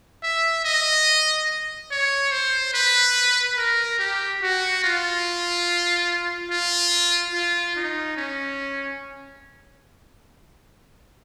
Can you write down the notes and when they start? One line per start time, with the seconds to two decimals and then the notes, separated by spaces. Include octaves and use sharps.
0.23 E5
0.65 D#5
1.91 C#5
2.32 C5
2.74 B4
3.57 A#4
3.99 G4
4.42 F#4
4.84 F4
6.51 F4
7.34 F4
7.76 D#4
8.17 C#4